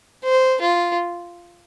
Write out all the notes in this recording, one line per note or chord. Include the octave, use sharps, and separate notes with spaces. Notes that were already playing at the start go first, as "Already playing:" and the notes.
C5
F4